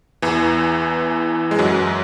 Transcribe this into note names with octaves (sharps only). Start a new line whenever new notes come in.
E2 E3
G#3
F#2 F#3